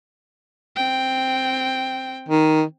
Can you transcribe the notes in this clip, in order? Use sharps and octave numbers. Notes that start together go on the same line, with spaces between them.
C4 G5
D#3